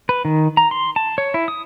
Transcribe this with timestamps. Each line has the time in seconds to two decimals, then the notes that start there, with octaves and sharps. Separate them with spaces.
0.09 B4
0.25 D#3
0.57 A#5
0.71 C6
0.96 A5
1.18 C#5
1.34 E4
1.48 D#6